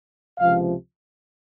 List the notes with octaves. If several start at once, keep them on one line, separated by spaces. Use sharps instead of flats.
C#2 C3 F3 F5